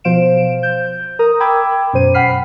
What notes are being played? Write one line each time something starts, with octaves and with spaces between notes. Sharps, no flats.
B2 F3 C5 F5 D7 E7
G6
A#4 A#5 D#6
G5 B5 D6 E6 G#6
F#2 B2 C5 D#7
F#5 G5 B5 F6 B6 C7